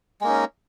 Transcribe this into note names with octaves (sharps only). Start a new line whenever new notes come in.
G#3 A#3 C#4 D#4